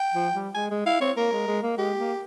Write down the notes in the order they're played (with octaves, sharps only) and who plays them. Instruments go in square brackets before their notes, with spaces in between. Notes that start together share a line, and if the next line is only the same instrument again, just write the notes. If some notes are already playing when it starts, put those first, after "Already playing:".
Already playing: [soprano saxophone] G5
[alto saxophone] F3
G3
[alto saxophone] G#3 [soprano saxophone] G#5
[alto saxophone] G#3
[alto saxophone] E4 [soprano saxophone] F5
[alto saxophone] C4 [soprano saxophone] C#5
[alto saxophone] A#3 [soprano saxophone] A#4
[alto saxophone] G#3
G#3
A#3
[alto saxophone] G#3 [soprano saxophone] G4
[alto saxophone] A#3